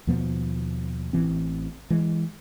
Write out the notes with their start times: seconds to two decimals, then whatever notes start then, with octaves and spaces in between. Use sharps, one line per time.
0.07 D#2 B2 F3 B3
1.13 A1 E3 C4
1.90 E3 G#3